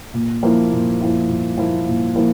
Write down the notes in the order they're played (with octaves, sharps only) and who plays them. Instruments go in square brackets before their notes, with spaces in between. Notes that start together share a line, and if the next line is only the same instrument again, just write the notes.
[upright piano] A#2
F3 A#3 E4
A#2
F3 A#3 E4
A#2
F3 A#3 E4
A#2
F3 A#3 E4